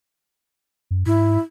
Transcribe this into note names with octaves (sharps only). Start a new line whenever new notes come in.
F#2
G#2 E4